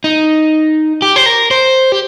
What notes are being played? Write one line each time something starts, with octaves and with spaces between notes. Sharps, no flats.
D#4
G4
C5
A#4
C5
G4